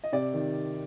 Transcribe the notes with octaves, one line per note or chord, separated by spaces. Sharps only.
D#5
C3 D5
D#3